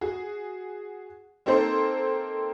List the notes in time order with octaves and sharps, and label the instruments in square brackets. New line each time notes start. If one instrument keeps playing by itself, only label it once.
[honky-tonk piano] F#4 G#4
A#3 C4 D#4 A4 C5